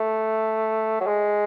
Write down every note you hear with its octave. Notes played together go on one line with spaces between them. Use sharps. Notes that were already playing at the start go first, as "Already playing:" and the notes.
Already playing: A3
F#3
G#3